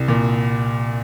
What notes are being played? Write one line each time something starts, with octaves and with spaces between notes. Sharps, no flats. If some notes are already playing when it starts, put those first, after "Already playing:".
Already playing: C2
A#2